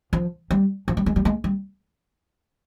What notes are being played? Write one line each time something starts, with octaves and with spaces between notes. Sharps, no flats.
F3
G3
F3
G3
G#3
G3
G#3
G3